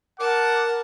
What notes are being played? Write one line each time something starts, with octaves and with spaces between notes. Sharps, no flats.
A#4 F#5 A5 D6